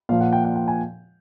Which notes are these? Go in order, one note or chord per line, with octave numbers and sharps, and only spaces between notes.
A#2 F3 F5
F#5
G5
G5
G5
G#5